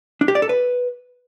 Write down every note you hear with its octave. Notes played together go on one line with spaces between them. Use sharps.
D4
G4
D5
A4
B4